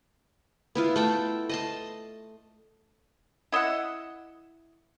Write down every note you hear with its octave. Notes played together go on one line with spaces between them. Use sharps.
B3 E4 F4
A3 A4 G5
D#5 A5 C6
E4 D#5 E5 F#5